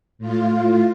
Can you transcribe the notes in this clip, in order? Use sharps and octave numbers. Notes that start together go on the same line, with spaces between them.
A2 F4